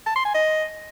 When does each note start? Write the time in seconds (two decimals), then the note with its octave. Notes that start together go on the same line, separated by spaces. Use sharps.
0.06 A5
0.16 C6
0.25 G#5
0.34 D#5